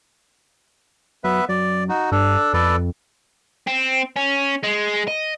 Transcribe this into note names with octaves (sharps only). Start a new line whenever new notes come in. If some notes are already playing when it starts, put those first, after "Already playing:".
F#2 B3 B4 E5
F#2 D5
D#4 F#4
G2 D4 A4
F2 A4 B4 D5
C4
C#4
G#3
D#5